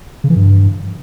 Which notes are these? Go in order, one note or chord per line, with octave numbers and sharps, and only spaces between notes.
C#3
E3
G2